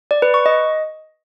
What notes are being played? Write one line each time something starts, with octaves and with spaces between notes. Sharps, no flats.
D5
B4
C#6
D#5